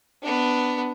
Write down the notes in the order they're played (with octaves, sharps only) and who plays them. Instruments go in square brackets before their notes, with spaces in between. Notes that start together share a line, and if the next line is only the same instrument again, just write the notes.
[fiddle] B3 D4